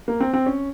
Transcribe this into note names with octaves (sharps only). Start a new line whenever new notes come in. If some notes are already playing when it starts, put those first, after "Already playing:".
A#3
C4
C4
C#4